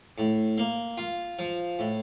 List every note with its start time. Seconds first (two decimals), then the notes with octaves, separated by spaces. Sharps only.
0.18 A2
0.58 A#3
0.98 F4
1.39 F3
1.79 A2